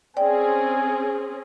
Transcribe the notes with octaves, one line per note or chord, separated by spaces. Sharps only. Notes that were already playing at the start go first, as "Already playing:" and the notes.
C4 C#4 G#4 D5 G5 G#5